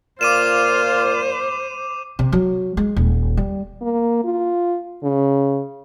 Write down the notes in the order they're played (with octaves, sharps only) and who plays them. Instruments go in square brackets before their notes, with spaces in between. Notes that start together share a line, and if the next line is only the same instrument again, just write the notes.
[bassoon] A#2 [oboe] F4 [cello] C5 [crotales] D6 D#7 E7
[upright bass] C3
F#3
G#3
D#1
G3
[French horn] A#3
F4
C#3